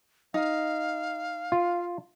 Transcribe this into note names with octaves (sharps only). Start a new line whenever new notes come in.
D#4 F5
F4